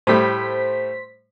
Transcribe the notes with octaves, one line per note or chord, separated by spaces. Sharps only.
A2 G3 A3 C5 B6